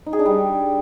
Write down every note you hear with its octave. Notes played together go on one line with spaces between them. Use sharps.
D#4
G#4
D4
G3